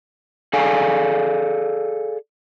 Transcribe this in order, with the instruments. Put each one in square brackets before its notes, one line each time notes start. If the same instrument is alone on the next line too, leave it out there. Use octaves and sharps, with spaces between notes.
[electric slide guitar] G#4 A4 D5 F5 G#5